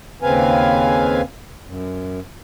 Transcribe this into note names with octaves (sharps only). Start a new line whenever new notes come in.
D#2 C#3 C4 B4 F5 G#5
F#2